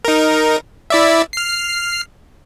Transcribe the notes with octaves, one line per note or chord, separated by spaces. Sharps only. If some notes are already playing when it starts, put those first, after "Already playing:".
D#4 A#4
E4 D5 E5
F6 C7